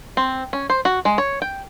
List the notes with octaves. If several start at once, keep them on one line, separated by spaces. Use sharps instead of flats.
C4
C#4
C5
F#4
G#3
C#5
G5